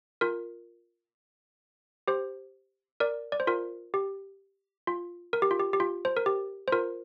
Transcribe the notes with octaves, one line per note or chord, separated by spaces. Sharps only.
F4 A#4
G4 C5
A#4 D5
D5
C5
F4 A#4
G4
F4
A#4
G4
F4
G4
G4
F4
C5
A#4
G4
C5
F4 A#4